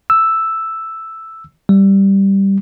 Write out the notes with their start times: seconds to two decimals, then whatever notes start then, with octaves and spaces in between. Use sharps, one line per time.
0.10 E6
1.69 G3